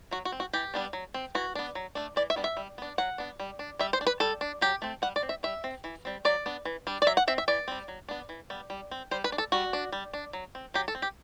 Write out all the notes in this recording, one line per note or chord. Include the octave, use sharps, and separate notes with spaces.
F#3 F#4
F#4
C4
F#4
E3 G4
G3 B3 D4
F#3
C4
E3 F#4
B3 D4
F#3
A3 D4
E3 D5
E5
G3 B3 D4
E5
G3
B3 D4
F#3 F#5
B3 D4
G3
D4
G3 E5
C5
D4
B4
G3 A4
D4
F#3 G4
A3 C4
G3 F#5
D5
C4
E5
G3 E5
C4
E3
G3 C4
F#3 D5
B3 D4
E3
G3 D4
D5
F#3 E5
F#5
C4 E5
E5
E3 D5
G3 C4
F#3
B3 D4
E3
G3 B3
G3
C4
G3 C5
B4
D4
A4
G3 F#4
D4
G3
D4
F#3
C4
F#3 G4
A4
C4
G4